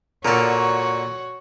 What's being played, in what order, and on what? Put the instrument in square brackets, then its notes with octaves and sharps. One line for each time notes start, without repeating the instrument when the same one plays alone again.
[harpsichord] A#2 D3 A4 [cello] F#4 C#5 [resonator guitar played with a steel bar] A#4